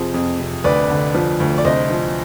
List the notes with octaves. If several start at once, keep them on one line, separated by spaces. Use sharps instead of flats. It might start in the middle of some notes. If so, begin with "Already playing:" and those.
Already playing: F2 C3 F3 G#4 C5
F2
C3
D2 B4 D5
D3
F3
D2
D5
C2 C5 D#5
F3